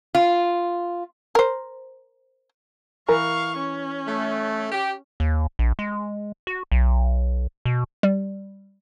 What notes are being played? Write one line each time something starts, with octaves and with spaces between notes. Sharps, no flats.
F4
A#4 C5
E3 A#4 F5 A#5 C#6
C#4
A3
G4
D#2
A#1
G#3
F#4
B1
B2
G3